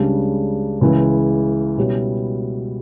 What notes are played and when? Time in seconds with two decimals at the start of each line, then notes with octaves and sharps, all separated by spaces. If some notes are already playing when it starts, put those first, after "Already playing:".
Already playing: C#2 C#3 G3 D4
0.81 C#2 C#3 E3
1.77 B2 G3 C#4 E4